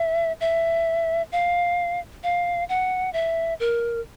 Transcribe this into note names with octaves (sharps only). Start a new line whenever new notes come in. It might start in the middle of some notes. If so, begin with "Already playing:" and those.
Already playing: E5
E5
F5
F5
F#5
E5
A#4